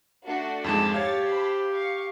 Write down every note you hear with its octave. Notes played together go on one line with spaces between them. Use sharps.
A3 D4 F#4
F2 G#2 G#3 A5
G4 C#5 F5 G#6 A6
C5 A5 B5
F5 C#6